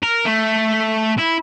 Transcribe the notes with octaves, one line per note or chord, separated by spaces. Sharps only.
A#4
A3
E4